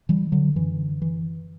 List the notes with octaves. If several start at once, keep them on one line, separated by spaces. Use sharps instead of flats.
E3 G3
D3 F#3
F#2 D3 E3
E3